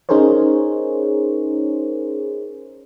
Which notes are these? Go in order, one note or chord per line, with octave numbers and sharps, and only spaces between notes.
C#4 D#4 G#4 A#4 C5 C#5